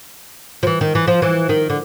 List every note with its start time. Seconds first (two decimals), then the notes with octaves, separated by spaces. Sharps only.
0.63 F3
0.67 E3
0.81 D#3
0.95 E3
1.08 F3
1.22 E3
1.49 D#3
1.70 D3